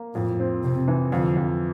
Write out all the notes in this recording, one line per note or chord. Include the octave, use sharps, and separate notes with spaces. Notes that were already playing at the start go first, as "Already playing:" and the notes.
Already playing: A#3
F2 A2
C4
C3 C4
E3
F2 D3
F2